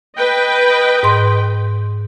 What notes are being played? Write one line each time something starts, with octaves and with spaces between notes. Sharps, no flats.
B4 D#5 G5
G#2 C6